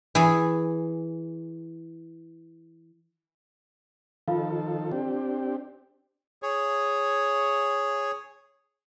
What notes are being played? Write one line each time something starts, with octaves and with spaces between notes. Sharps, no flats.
E3 G#4
D#3 F3 F4 A4 F5
C4 D4 G4
G#4 C#5